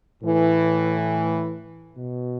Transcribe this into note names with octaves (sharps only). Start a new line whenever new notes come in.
A2 E3
B2